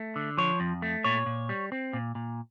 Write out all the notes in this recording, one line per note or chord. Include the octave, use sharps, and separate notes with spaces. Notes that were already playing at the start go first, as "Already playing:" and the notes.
Already playing: A3
D3
F3 C#5
F2
A3
A#2 C#5
A#2
G3
C4
A#2
A#2